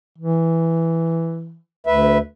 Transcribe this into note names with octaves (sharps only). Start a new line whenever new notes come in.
E3
D2 B4 E5